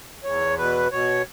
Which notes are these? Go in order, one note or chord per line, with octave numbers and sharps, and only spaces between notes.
E2 C#5
B2 B4
B2 C#5